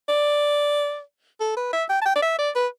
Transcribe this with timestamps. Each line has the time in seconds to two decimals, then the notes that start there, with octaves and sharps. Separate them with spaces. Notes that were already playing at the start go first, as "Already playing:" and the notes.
0.09 D5
1.40 A4
1.57 B4
1.73 E5
1.90 G5
2.01 A5
2.06 G5
2.16 D5
2.22 E5
2.39 D5
2.56 B4